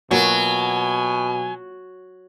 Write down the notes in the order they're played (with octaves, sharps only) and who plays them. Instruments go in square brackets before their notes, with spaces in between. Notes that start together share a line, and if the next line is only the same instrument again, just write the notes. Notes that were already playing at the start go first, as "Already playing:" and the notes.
[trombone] B2 [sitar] F#3 [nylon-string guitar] A#3 F4 F#4 [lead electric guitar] G#5